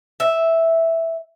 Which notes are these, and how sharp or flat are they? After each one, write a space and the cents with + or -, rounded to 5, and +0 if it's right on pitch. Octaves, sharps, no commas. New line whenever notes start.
E5 -5